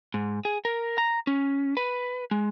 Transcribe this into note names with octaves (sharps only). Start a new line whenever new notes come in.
G#2
G#4
A#4
A#5
C#4
B4
G#3